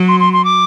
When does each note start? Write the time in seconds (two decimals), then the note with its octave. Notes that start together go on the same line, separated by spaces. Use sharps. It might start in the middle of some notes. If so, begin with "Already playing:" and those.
Already playing: F#3
0.08 C6
0.20 C6
0.33 C6
0.44 D6